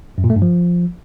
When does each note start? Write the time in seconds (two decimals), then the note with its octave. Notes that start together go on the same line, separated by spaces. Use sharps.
0.18 F#2
0.24 A#2
0.30 A3
0.36 G2
0.42 F3